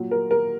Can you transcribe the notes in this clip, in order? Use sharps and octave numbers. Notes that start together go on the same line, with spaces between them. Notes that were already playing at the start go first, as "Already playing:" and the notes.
Already playing: A#2 F#3
A#4
A#4